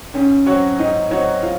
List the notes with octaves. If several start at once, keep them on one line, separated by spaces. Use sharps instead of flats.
G#2 C#4
F#3 C4 F#4 C#5
G#2 D#4
F#3 C4 D#4 F#4 C#5
F4